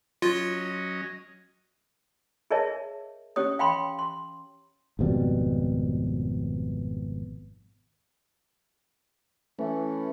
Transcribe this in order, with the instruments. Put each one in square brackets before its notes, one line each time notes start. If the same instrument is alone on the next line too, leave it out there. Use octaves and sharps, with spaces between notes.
[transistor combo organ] F#3 C#4 D#5 [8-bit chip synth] F4
[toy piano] G#4 A#4 C#5 D#5 E5 A5
C#4 G4 C#5 D#6
F5 G5 B5 C6
C6
[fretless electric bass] G#1 F2 B2 G3
[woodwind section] E3 [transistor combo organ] A3 C#4